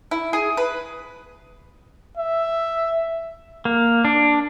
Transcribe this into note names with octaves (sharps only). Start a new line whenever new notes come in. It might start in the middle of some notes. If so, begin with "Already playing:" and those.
E4
G#4
B4
E5
A#3
D4